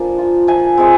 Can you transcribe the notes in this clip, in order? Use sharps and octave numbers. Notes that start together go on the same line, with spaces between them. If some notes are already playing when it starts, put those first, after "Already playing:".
Already playing: F3 A#3 D4 G#5
F4
F3 G#5
G#3 C4